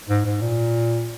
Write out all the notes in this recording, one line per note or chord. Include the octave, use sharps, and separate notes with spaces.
G#2
G#2
A#2